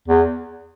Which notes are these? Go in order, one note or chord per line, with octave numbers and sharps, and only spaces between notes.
E2